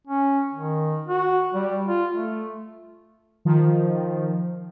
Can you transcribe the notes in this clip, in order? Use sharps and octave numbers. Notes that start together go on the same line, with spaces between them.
C#4
D#3
F#4
G3
F4
A3
D#3 F3